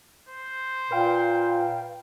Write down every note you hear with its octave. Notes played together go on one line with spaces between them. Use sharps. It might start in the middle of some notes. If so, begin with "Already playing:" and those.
C5
A#2 B4 F5 G5